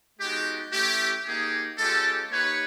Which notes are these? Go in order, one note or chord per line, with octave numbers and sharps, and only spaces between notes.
G#3 B3 D#4 F#4 G4
A3 C#4 E4 G4
A#3 D#4 G4 G#4
G#3 C#4 F4 G4 A4
A#3 D#4 G4 B4 C#5